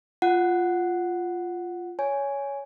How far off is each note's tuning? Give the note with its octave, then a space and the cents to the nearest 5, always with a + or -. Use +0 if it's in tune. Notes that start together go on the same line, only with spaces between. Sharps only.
F4 +0 F#5 +0
C#5 +15 G#5 +0